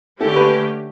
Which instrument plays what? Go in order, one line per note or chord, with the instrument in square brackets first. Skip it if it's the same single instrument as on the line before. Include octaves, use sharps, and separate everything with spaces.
[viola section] D3 A3 C#4 G4 [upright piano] A4
[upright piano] B4